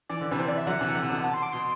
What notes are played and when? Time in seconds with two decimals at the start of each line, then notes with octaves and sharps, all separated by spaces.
0.09 E3 D5
0.21 D3
0.31 C3 E3 B4
0.39 C5
0.48 D5
0.57 E5
0.67 D3 F#3 F#5
0.81 C3 E3
0.95 D3
1.03 C3
1.10 B2 D3
1.24 A5
1.34 C6
1.43 D6
1.52 B2 C6